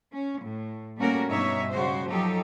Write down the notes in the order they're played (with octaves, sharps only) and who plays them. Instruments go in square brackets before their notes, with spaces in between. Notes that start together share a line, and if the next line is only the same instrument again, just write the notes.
[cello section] C#4
A2
G3 A3 A#3 C#4 F#4 A#4
G2 B2 D#4 C#5 E5
C#3 G3 G#3 F#4 C5
F3 F#3 D#4 G4 A4